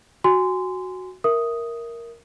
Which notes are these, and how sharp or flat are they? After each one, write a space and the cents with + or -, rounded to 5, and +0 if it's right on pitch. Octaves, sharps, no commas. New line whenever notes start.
F#4 +0 G#5 -15 C6 -20
A#4 +0 E5 +0 D#6 +0